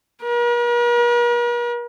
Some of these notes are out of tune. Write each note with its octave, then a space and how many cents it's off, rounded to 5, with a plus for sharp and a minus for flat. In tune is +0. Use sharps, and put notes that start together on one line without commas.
A#4 +45